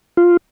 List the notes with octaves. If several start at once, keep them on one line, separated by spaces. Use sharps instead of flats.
F4